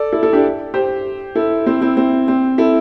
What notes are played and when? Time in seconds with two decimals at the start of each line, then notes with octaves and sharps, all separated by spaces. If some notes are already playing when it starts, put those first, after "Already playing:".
Already playing: A4 D5
0.13 E4 A4
0.23 E4 A4
0.33 D4 G4
0.74 G4 C5
1.35 E4 A4
1.66 C4 E4
1.81 C4 E4
1.97 C4
2.28 C4
2.58 E4 A4